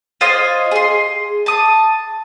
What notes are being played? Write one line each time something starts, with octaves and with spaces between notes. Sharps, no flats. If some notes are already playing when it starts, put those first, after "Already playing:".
F4 C5 C#5 D#5
G#4 C6
A5 D#6